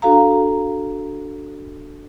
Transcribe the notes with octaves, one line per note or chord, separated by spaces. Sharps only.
D4 F#4 A4 F5 A#5